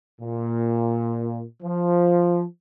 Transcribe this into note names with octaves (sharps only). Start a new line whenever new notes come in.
A#2
F3